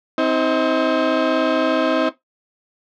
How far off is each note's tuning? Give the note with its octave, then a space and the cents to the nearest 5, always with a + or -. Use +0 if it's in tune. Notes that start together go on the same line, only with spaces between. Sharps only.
C4 +0 D#4 +40